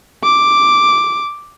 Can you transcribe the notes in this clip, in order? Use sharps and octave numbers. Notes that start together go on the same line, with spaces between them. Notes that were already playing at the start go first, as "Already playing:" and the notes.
D6